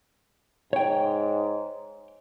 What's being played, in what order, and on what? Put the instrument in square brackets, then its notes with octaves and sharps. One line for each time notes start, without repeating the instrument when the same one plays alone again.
[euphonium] G#2 [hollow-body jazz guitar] C#5 G5